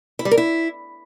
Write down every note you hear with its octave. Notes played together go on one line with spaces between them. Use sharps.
E4
G3
A#4
E4